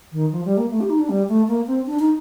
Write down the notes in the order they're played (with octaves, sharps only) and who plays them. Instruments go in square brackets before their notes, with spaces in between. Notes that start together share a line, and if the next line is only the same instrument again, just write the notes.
[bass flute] D#3
F3
G3
A#3
A3
G4
D#4
D4
G3
A3
A#3
C4
D4
D#4